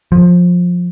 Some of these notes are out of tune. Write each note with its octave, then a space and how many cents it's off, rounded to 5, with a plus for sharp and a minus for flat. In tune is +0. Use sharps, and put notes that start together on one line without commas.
F3 +20